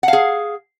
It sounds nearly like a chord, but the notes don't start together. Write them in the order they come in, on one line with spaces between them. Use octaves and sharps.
F#5 F5 G#4